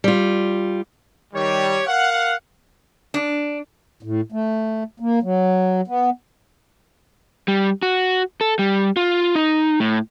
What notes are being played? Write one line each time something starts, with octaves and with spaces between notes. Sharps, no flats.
G3 F4
D#3 G3 G4 C#5
A#4 F5 F#5
D4
A2
A3
A#3
F#3
B3
G3
F#4
A4
G3
F4
D#4
A2